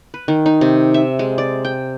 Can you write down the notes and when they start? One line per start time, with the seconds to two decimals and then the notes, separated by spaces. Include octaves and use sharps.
0.14 B4
0.28 D#3
0.46 D#4
0.61 C3
0.94 E5
1.19 G#3
1.38 D5
1.65 G5